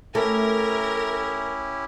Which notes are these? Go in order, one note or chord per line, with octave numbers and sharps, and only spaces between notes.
A3 C#4 E4 G4 A#4